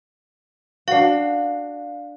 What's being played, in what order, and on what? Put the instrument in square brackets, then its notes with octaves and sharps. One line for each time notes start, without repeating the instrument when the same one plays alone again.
[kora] D4 F#4 [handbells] F5 C7